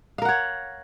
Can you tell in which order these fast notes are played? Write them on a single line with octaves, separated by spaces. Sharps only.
F5 A#4 F#5 C#5